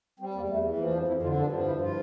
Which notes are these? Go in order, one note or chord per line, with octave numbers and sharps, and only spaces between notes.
G3 C4
E2 A#3
E2 A3
E3
F3 A#3
F2 D4
F2 E4
D3 F4
G2 D4
F3
G2 E4
F3 F4